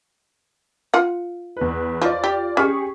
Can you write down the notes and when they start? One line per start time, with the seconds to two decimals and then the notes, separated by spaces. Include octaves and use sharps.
0.94 F4 F#5
1.57 E2 B4
2.02 F3 F4 D5
2.24 G4
2.57 C#4 G4 G#4 C#6